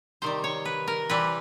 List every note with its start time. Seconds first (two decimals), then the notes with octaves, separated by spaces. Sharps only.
0.22 C3 D#3 G3 C5
0.44 C#5
0.65 B4
0.88 A#4
1.10 C3 E3 G3 B4